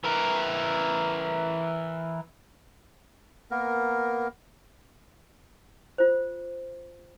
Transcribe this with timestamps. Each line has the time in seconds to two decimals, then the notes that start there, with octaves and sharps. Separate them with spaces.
0.04 E3 A#4
3.51 A#3 B3 A#4
5.98 F4 C5